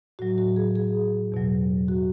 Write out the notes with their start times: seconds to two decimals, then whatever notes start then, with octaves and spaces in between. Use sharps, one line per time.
0.19 A2 F#3 F#4
0.38 F#4
0.56 G#4
0.76 G#4
1.32 E2 B2 F#3
1.88 F#4